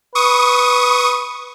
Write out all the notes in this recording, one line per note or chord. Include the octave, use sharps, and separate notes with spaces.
B4 C#6 D#6